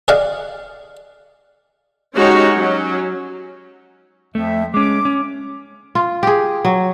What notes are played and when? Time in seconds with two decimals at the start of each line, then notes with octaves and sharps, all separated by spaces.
0.08 G#4 D5 D#5 F5 F#5
2.15 G#3 C#4 D#4 F#4 G4 C#5
2.57 F#3 C#4
4.35 F2 F3 A3 E5
4.74 G#3 C#4 D6
5.05 C#4
5.95 F4
6.23 G4 G#4
6.65 F#3